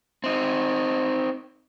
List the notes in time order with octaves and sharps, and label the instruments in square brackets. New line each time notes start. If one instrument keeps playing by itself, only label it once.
[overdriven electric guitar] C4 D#4